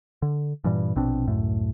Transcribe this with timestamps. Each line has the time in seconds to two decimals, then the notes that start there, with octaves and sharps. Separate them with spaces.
0.22 D3
0.64 G2 A#2 E3 G3
0.96 A#1 B2 C4 D4
1.27 C#2 F#2 A2 A3